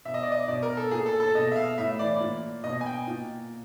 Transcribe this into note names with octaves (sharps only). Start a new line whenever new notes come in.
B2 E5
D#5
D5
D#5
B2 D5
A#4
A4
A#2 G#4
A4
A4
B2 D#5
E5
F5
A2 E5
E3 D5
A#2
B2 D#5
G#5
G5
A#2